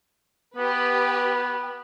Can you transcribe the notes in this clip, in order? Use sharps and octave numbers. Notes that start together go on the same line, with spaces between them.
B3 G4 B4